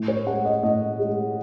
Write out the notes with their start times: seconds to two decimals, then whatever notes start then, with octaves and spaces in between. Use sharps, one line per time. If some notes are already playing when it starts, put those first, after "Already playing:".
Already playing: A2
0.08 C#5
0.26 G#3 F#5
0.45 D#5
0.63 A2 D#5
0.99 G#3